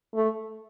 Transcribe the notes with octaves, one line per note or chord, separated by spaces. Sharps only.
A3